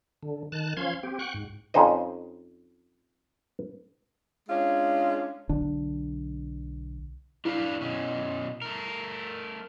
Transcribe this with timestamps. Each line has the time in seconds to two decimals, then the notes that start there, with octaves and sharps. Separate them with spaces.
0.23 D3
0.52 D#3 A5 F#6
0.77 F3 C#4 F5 C6 G#6
1.03 C4 G4
1.19 F#5 G5 C#6 F#6
1.34 G#2
1.74 F2 C#4 D#4 C5 D#5
4.49 G#3 C#4 D4 F4
5.49 B1 D3 D4
7.45 D4 E4 B4 F5
7.81 B2 C#4
8.62 A3 A#4